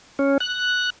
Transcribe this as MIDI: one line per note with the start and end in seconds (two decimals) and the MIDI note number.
0.19 0.38 61
0.40 0.90 90